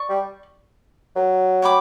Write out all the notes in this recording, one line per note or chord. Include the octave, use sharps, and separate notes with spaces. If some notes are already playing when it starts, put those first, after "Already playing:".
Already playing: D5 C#6
G3
F#3
C#5 G5 B5 D6